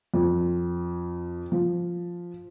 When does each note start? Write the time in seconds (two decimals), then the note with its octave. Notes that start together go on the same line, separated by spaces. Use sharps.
0.14 F2
1.52 F3